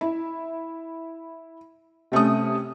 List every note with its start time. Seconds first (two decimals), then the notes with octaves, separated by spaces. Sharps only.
0.01 E4
2.12 C3 A3 C#4 D#6